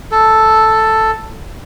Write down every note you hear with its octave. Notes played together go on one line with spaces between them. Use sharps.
A4